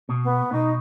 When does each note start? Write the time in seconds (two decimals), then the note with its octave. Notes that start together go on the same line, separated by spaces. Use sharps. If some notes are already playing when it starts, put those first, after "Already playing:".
0.09 B2
0.24 B3
0.52 B2 D#4